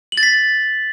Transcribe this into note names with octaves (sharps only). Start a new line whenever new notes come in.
F#7
A6
B6